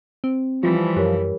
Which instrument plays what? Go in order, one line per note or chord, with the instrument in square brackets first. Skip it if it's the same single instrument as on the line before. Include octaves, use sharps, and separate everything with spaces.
[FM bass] C4
[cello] E3 G3 [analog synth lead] F3
[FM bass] F#2 [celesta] G4 A#4 C#5